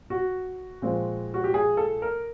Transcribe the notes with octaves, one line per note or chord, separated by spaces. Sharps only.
F#4
A#2 F3 G#3 C4
F#4
G4
G#4
A4
A#4